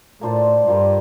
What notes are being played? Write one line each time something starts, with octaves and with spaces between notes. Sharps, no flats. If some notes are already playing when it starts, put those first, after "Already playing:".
A2 A#3 D4 F4 C5
G2 G3 A#3 F4